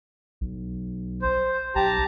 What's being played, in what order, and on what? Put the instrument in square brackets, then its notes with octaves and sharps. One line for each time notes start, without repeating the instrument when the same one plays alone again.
[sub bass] B1
[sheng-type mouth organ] C5
[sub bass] B1 [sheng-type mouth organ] G4 A5 A#5